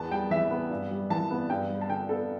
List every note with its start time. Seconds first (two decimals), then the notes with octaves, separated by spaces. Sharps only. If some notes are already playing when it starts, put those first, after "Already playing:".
Already playing: E2 B3 A5
0.11 G3 G5
0.30 E3 E5
0.50 B3
0.70 G2
0.90 G3
1.10 E3 A5
1.31 B3
1.50 G2 G5
1.70 G3
1.81 A5
1.89 D3 G5
2.09 B3 A4